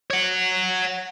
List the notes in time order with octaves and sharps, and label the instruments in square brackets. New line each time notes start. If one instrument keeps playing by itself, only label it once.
[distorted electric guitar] C#5 F#5